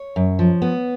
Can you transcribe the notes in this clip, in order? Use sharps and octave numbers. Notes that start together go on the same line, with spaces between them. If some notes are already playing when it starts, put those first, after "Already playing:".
Already playing: C#5
F#2
F3
B3